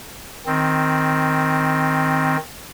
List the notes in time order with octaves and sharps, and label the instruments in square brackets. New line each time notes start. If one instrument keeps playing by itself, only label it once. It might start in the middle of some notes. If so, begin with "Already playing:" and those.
[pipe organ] D#3 C4